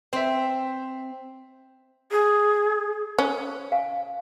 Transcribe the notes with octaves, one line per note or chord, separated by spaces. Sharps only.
C4 C5 E5
G#4
C#4 C5
F5 G#5